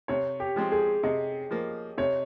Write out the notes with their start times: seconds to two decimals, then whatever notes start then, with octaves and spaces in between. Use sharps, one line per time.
0.08 C3 C#5
0.40 G4
0.56 F3 G#3 C4
0.72 G#4
1.03 C3 D#5
1.51 F3 A#3
1.98 C3 C#5